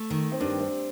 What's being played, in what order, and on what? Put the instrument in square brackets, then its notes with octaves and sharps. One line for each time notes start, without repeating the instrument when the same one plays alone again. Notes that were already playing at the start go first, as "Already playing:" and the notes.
Already playing: [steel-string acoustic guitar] A3
D#3
[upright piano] C4
[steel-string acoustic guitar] G2 [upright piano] D4
[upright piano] C4